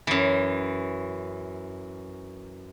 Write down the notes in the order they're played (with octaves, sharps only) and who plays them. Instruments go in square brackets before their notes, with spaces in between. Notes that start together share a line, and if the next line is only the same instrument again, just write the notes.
[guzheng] F#2 E3